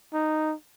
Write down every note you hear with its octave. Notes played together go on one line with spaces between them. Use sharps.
D#4